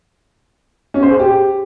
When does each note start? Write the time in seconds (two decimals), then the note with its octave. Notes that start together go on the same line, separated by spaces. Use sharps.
0.94 C#4
1.03 C5
1.11 G#4
1.19 G4